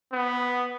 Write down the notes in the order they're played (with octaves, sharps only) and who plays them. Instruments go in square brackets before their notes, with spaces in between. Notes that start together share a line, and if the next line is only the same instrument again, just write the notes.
[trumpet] B3